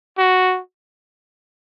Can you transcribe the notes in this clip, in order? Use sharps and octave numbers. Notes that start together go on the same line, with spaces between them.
F#4